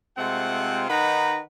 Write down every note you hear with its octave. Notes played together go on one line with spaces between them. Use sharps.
C3 G#3 A3 C4 F4 F#5
D#3 D#4 B4 F#5 A#5 B5